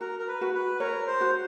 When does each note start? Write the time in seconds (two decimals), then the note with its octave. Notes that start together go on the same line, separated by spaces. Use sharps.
0.01 F#4 A#4
0.19 A#4
0.28 B4
0.41 F#4
0.54 B4
0.80 A#4 C#5
1.07 C5
1.21 F#4